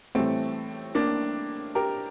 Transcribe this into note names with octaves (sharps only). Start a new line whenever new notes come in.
A2 E3 G3 A3 C4
A#3 D4
G4 A#4